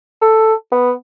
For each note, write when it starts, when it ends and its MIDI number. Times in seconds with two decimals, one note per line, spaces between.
0.22 0.53 69
0.72 0.92 59